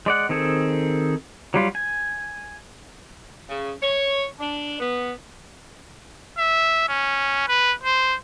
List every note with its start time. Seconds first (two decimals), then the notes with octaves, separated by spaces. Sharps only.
0.06 G#3 D5 F#5
0.29 D#3 C4 G#4 A4
1.54 F#3 G3 F4
1.75 G#5
3.49 C#3
3.81 C#5
4.39 D4
4.79 B3
6.38 E5
6.88 C#4
7.48 B4
7.83 C5